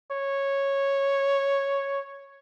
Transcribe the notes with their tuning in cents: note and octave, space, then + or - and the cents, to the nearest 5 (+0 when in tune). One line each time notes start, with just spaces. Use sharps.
C#5 -5